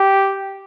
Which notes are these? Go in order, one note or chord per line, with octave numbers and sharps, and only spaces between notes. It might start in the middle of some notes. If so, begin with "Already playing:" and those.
Already playing: G4